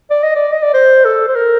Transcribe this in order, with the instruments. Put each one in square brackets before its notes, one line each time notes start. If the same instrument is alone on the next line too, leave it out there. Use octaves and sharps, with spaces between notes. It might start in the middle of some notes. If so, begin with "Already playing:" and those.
[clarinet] D5
D#5
D5
D#5
D5
C5
A4
C5
A#4